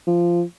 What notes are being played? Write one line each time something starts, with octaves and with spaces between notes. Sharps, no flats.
F3